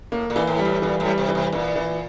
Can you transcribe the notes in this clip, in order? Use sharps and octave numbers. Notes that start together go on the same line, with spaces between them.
A2 A#3
A#2
E3
A2
G3
A2
A#2 E3
A2
G3
C3
E3
C3
A#2 E3
E3